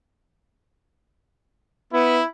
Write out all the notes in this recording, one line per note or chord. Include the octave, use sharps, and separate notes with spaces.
B3 E4